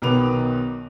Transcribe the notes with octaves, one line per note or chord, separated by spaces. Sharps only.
B1 B2 D#3 B4 D6 F7